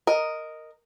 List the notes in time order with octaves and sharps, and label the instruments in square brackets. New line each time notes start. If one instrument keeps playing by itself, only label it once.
[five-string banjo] A#4 D#5